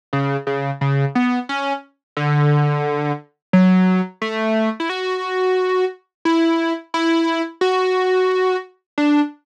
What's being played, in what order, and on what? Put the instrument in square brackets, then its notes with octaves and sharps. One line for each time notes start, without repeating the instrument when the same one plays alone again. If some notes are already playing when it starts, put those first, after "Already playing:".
[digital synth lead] C#3
C#3
C#3
B3
C#4
D3
F#3
A3
E4
F#4
E4
E4
F#4
D4